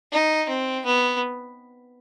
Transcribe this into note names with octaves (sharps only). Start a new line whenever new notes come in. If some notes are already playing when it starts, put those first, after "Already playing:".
D#4
C4
B3